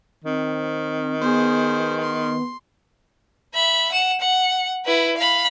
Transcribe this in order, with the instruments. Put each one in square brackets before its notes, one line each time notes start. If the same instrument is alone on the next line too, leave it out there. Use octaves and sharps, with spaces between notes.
[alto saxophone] D#3 [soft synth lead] C4
[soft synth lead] B3 [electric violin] G#4 C5
[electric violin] C6
[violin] E5 B5
F#5 E7
F#5
E4 B4
F5 B5